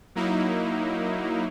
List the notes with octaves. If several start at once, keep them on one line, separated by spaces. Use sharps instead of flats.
F#3 A#3 D#4 E4